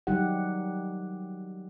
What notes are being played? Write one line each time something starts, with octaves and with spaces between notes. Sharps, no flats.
D#3 F#3 G3 D#4 G4 F#5